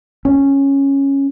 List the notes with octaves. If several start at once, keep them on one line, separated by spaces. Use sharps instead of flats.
C#4